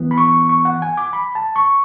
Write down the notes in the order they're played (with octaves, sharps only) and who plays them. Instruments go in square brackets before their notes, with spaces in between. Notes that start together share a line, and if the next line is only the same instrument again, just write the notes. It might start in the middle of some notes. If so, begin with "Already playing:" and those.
Already playing: [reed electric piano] E3 B3
B5
C#6
C#6
F#5
G#5
D6
B5
A5
C#6